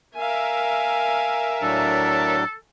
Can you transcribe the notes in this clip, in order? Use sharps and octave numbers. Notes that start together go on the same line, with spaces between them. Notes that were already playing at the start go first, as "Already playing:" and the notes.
A#4 E5 F5 G#5
A2 F#3 D4 A4